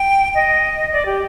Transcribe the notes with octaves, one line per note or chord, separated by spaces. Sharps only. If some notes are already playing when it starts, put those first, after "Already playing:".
Already playing: G5
D#5
D5
G4